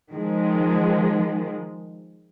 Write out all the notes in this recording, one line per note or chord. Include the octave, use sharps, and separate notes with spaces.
D#3 F3 G#3